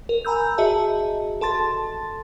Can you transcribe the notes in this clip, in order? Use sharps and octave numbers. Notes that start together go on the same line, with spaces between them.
A#4
G#5 A#5 B5 E6 G6
F#4 G#4 D#5 E5 A5
A4 A5 C6 A6